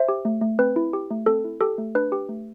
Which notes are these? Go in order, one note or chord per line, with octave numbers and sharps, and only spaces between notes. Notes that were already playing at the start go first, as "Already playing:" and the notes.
Already playing: C5 E5
G4
A3
A3
C4 B4
E4
G4
A3
C4 A4
E4
G4 A4
A3
D4 B4
G4
A3